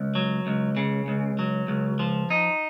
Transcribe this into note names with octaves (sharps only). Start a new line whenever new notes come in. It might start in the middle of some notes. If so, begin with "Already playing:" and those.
Already playing: C#2
F#3
C#2
C#3
C#2
F#3
C#2
F3
D#4